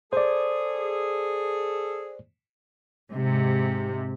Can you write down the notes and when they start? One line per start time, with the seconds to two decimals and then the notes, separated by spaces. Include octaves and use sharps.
0.13 G#4 A4 C5 D5
3.11 G#2 C3